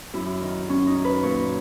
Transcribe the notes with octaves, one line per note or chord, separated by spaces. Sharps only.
F#2 E4
D#3
F#2 C#4
D#4
D#3
B4
A#2 C#5